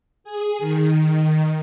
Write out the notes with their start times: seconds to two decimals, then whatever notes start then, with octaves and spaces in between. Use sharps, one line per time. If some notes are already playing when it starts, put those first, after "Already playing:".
0.24 G#4
0.59 D#3